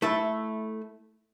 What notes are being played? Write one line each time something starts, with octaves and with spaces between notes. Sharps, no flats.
A3 E4 A4